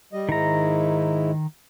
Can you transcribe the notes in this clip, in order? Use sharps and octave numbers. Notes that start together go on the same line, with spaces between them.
G3 D#5
G#2 D#3 G#3 E4 A#5